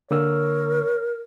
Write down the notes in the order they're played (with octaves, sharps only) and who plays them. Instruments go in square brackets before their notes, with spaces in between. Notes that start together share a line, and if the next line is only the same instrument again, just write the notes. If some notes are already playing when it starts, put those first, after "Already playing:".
[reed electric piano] D3 A#3 E6 [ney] A#4 [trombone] C#5